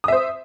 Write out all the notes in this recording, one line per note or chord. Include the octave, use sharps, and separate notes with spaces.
C5 E5 D#6